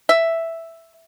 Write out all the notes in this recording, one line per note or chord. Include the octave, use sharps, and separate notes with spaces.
E5